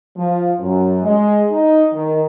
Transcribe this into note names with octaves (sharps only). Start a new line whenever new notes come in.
F3
F#2
G#3
D#4
D#3